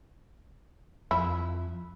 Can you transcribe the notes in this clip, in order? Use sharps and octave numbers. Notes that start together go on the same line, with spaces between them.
F2 E4